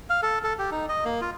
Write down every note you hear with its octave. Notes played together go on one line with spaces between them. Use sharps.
F5
A4
A4
G4
D#4
D#5
A#3
F4